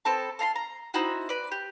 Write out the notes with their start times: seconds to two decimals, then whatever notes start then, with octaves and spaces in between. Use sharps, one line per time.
0.05 B3 C4 A4 A5
0.39 A4 F5 A#5 C6
0.56 A#5
0.94 C4 D#4 E4 F#4
1.29 B4 D5
1.51 G4